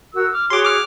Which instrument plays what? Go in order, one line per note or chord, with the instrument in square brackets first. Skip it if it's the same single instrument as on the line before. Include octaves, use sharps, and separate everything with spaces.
[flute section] F#4 A#4 E6
D6 F6
[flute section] F#4 G#4 C#5 [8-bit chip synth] C6 D6
[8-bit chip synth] D6 F6